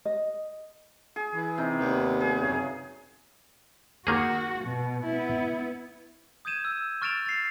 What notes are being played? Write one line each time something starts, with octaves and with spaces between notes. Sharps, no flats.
D#5
G#4
E3
C3 D#4
D#2 G3 B3
G#4
F#2 C#3
D#3 A#3 F#4 G#4
B2
B3 E4
D#6 G6 G#6 D#7 E7
E6
C#6 F6 A6 D7 E7 F7
A6 C7